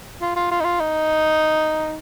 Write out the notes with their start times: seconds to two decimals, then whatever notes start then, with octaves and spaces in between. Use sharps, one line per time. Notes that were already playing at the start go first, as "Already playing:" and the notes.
0.21 F4
0.36 F4
0.51 F4
0.60 D#4
0.64 F4
0.80 D#4